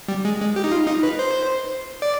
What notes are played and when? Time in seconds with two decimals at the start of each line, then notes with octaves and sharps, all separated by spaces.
0.08 G3
0.25 G#3
0.40 G#3
0.56 G4
0.64 D#4
0.72 F4
0.87 D#4
1.03 B4
1.19 C5
2.02 D5